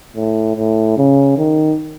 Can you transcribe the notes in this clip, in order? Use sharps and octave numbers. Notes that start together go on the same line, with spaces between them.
A2
A2
C#3
D#3